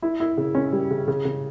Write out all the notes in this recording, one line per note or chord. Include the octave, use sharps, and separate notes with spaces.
E4
E4
C#3
C#4
G3
C#3
C#3
C#3